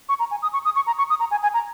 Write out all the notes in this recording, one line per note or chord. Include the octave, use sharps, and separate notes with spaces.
C#6
A#5
G#5
D#6
C#6
D#6
C#6
A#5
C#6
D#6
A#5
G#5
G#5
A#5